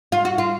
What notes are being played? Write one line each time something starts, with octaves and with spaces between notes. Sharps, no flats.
F4
F#4
F4